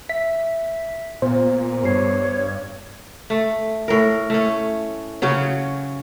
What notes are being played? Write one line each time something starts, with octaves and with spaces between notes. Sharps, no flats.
E5 B6
A#2 B3 C5
G2 B3 C#5 C7
A3
A2 A#4
A3 C#4
C#3 F#3 C#4